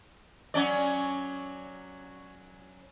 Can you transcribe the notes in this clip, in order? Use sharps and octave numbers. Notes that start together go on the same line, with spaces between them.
F#3 C#4 D5